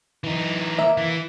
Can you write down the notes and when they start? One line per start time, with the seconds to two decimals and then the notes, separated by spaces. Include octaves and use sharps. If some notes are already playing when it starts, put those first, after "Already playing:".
0.24 E3 D#4
0.78 A#3 E5
0.97 E3